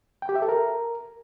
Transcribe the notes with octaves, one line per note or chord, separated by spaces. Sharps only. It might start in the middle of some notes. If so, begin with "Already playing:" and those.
G5
G4
E5
A4
A#4